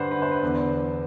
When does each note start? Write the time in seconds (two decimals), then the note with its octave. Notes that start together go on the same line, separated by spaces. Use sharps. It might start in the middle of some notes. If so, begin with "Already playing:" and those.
Already playing: G2 D3 B4 C5 D5 F#5
0.11 B4
0.22 C5
0.32 B4
0.43 E2 D3